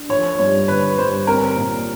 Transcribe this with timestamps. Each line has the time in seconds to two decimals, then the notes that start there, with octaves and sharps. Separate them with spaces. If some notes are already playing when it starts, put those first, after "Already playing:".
Already playing: D4
0.09 F3 C#5
0.39 G2 C#5
0.68 D3 B4
0.98 G2 C5
1.27 C4 A#4
1.57 A#2